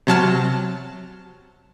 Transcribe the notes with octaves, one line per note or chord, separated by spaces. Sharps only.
C3 F#3 A5 F6